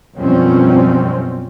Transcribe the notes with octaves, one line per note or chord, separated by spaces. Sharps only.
F#2 B2 F3 G3 C4 C#4